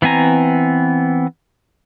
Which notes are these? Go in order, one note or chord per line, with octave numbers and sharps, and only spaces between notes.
E3 B3 C4 G#5 A#5